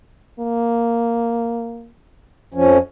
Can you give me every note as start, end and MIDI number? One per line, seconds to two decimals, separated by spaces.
0.39 1.90 58
2.54 2.78 41
2.54 2.78 53
2.54 2.78 61